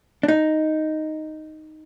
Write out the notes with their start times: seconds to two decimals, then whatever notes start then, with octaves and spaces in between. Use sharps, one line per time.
0.23 D4
0.28 D#4